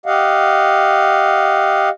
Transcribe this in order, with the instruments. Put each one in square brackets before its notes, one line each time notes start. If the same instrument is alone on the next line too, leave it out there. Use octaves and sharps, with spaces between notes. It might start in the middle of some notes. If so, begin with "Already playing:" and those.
[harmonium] G4 D#5 F5 F#5